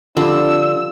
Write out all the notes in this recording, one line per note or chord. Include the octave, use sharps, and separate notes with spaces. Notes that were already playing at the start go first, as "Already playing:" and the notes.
D3 F3 G3 C4 D4 E6